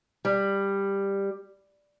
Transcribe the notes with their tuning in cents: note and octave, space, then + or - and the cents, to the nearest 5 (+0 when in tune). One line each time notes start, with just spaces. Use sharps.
G3 +10